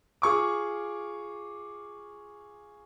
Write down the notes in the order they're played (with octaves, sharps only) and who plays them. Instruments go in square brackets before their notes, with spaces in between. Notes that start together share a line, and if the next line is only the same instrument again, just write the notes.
[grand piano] F4 G#4 C#6 D6